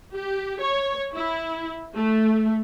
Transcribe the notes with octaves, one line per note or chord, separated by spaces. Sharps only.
G4
C#5
E4
A3